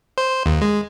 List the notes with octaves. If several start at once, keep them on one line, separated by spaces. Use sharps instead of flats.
C5
D#2
G#3